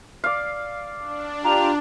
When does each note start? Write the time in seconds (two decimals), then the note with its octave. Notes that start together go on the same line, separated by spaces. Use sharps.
0.24 D5 F5
1.00 D4
1.44 F4 G4 A#5